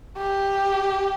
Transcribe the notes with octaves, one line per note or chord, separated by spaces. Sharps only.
G4